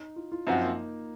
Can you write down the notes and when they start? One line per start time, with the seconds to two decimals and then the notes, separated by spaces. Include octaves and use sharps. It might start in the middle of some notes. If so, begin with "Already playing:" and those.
Already playing: D#4
0.16 F4
0.32 F4
0.47 F#2 F3 C4 D#4 F#4
0.62 A#3